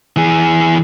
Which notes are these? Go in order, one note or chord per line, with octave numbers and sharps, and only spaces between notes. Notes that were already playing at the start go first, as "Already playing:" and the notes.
E3 G#4